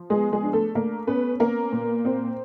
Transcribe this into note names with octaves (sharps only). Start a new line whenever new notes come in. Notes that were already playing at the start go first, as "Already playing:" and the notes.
Already playing: F3
G#3 B3 G#4
G#3 G#4
D4
A3 A4
A3 A#3 A#4
B3 C#4 B4
A#3 B3 A#4
A#2
C4